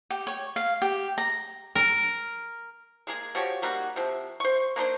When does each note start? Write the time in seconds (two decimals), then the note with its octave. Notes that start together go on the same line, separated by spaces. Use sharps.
0.10 G4
0.27 C#5
0.56 F5
0.82 G4
1.18 A#5
1.75 A#4
3.07 G#3 A#3 G#4
3.35 F3 F#4 G4 C#5
3.62 G3 A#3 D#4 F#4
3.96 C3 F3
4.40 C5 C#6
4.76 A#3 D4 D#4 C5